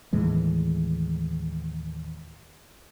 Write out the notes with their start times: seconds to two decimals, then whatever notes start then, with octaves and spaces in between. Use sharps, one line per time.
0.13 D#2 A2 E3 G#3